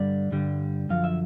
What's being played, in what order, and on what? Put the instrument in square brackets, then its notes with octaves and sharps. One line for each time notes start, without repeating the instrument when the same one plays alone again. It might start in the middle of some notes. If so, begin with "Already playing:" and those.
Already playing: [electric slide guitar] G2 D3 G3 D5
G2 D3 G3
F#2 D3 F3 F5
E5